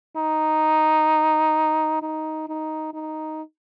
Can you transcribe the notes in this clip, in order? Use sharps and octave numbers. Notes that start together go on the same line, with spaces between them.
D#4
D#4
D#4
D#4